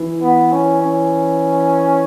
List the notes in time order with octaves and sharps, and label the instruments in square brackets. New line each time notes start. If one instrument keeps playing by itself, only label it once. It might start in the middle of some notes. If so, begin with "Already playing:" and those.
Already playing: [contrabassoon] E3
[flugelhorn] B3
C#4
C#4